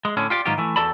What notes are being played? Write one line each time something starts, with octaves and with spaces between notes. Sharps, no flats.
G#3
A2 D3 C#4
F4 G4 D5
G#2 D#3 F#3 F4 G4
E3 A3
E2 F#4 A4 D5 A5 B5